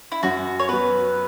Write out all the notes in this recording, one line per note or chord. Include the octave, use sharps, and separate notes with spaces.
E4
F#2 F#4
C#5
F#3 B3 B4